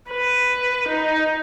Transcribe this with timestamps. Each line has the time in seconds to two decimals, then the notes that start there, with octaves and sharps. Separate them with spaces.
0.11 B4
0.88 D#4